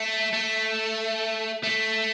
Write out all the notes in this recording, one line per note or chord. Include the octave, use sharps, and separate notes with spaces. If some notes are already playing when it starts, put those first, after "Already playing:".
Already playing: A3
A3
A3